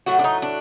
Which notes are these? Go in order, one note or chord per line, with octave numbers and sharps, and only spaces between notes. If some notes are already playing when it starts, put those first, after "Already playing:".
A2 F#3 A3 F#4
D4
D#4
D4